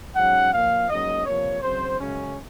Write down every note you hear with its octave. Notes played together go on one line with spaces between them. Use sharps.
G#2 F#3 C#4 F#5
A#2 F3 A#3 F5
G#2 F#3 A#3 C#4 D#5
C3 F3 A#3 C#5
C#3 F#3 C4 C5
F#2 C#3 G#3 C#4